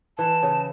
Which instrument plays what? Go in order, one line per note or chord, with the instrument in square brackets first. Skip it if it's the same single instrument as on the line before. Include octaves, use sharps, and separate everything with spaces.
[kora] E3 [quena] A5
[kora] C#3